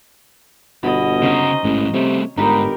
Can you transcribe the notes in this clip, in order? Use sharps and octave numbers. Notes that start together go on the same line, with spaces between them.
G1 B2 D#5 B5
C#3 C#4 D#4 F#4 C5
A1 G#2 E3
C3 G3 A3 C#5
G1 G#2 D#4 G4 A#4 B4